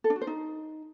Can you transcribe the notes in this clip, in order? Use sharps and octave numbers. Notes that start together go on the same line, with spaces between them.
A4
D4
F#4
C5
D#4